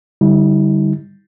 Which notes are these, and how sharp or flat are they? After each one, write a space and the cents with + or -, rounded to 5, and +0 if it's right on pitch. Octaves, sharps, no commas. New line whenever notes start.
D3 +0 G3 +0 E4 -45